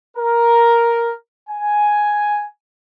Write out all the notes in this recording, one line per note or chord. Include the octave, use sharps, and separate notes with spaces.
A#4
G#5